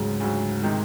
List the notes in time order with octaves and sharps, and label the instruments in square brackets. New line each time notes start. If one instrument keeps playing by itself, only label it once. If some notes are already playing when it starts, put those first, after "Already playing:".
Already playing: [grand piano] D2 C#3 F#3 [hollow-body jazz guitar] G#2
[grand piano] D2 C#3 F#3
C3 D#3 G#3